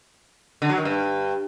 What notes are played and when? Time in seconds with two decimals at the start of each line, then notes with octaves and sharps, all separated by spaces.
0.62 D3
0.70 F#3
0.77 D#3
0.85 G2